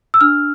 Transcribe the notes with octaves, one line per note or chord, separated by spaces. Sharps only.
E6
D4 F6